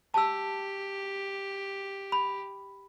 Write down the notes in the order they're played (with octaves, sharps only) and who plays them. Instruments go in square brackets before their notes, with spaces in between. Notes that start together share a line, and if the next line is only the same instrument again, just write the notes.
[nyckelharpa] G4 [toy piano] A5 E6
[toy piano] B5